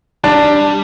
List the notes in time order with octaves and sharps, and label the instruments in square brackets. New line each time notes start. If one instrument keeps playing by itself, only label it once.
[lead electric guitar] G3 [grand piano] D4